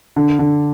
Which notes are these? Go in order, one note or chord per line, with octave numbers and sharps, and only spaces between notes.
D3
D3